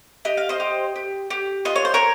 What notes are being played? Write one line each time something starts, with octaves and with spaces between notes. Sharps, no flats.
G4 D#5
F5
C5 D#5
G4
G4
G4
F4 D#5
C#5
C5
A#4 C#5